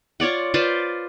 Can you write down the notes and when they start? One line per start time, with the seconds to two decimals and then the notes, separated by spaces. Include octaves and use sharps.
0.20 F4 C#5 D5 F#5
0.54 F4 B4 C5 D5